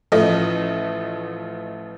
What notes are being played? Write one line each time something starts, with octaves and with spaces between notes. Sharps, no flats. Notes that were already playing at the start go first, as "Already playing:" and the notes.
A1 F3 A3 A4 D#5